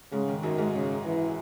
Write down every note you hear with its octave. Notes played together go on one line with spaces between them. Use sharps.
G#2 C#3 G#3
D#3
F#2 D#3 F#3
G#2 G#3
C#3
E3